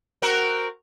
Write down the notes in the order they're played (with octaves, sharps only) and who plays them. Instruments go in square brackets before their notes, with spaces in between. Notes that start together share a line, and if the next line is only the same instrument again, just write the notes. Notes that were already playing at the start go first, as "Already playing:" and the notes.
[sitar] C4 F#4 A#4